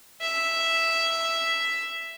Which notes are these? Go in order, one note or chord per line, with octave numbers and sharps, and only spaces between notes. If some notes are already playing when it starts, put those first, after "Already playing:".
E5